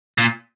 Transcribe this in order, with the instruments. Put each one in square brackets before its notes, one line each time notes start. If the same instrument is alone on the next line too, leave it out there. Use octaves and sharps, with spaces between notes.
[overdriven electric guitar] A#2